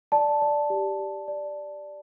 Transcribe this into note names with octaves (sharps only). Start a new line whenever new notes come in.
D5 A5
D5
G4
G4
D5